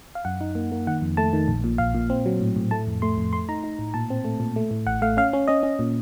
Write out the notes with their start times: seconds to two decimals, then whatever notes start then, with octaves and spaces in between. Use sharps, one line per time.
0.15 F5
0.25 F#2 F#5
0.41 D#4
0.55 A#3
0.72 A#3
0.87 D#3 F#5
1.02 F2
1.17 A3 A5
1.33 D#3
1.48 A#1
1.64 A#2
1.78 A#1 F5
1.94 A#2
2.10 C4
2.26 F#3
2.40 A2
2.56 A2
2.71 A3 A5
2.87 F2
3.02 A3 C6
3.18 F2
3.33 A3 C6
3.49 D#4 A#5
3.64 D#4
3.79 A2
3.94 A#2 A5
4.10 C4
4.25 A3
4.40 A#2
4.56 A3
4.71 A2
4.87 A1 F#5
5.02 A3 F5
5.17 C#4 F5
5.33 C#4
5.48 C#4 D#5
5.63 C#4
5.79 A#2